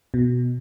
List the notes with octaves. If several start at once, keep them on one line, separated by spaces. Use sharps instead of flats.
B2